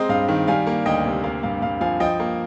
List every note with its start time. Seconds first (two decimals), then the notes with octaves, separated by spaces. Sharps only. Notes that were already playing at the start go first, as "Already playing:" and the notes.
Already playing: G#3 C4 D#5 A#5
0.09 G2 F5
0.29 D#3
0.48 G3 F5 G#5
0.67 A#3
0.86 D2 D#5 G5
1.04 C3
1.24 A#3 F5
1.43 G2 F5
1.62 G2 F5
1.81 F3 F5 G#5
2.00 F3 D#5 G5
2.20 A#3